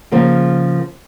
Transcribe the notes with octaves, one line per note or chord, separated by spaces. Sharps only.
C#3 F3 A#3